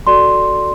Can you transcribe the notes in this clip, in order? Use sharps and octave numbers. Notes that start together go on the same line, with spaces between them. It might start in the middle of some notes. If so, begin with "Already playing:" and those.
F#4 A4 D5 C6